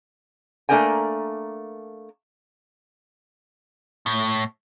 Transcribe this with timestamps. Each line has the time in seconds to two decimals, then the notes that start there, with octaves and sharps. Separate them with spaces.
0.69 A3 A#3 D4 A#4 G5 G#5
4.06 A2